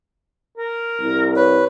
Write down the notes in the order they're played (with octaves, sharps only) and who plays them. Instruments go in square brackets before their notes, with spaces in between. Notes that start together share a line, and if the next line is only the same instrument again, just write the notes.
[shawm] A#4
[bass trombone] C2
[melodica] B4 [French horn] C#5